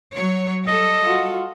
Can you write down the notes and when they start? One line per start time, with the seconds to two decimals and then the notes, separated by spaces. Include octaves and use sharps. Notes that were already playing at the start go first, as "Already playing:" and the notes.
0.14 F#3 C#5
0.67 G3 A4 D#5
1.04 F4 F#4